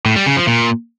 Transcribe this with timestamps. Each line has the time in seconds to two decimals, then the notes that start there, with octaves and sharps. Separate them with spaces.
0.06 A2
0.16 G3
0.26 C#3
0.37 F3
0.47 A#2